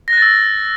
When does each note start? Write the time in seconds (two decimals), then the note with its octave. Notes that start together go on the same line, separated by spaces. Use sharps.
0.08 A#6
0.13 F#6
0.17 A6
0.22 E6